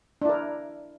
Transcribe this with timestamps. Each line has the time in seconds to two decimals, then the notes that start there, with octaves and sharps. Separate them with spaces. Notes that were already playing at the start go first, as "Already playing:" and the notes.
0.22 D4
0.25 E4
0.29 A#4